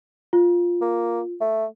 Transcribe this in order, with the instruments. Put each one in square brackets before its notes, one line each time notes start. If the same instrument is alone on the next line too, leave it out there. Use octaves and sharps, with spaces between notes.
[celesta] F4
[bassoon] A#3
A3